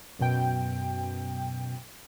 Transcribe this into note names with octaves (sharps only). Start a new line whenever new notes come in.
F#2 B2 G5